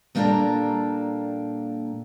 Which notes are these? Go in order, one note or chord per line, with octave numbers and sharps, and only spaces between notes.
A#2 G3 A#3 D4 A4 A#5